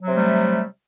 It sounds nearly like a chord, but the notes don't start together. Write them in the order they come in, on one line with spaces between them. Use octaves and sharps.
F#3 C3 A3 G3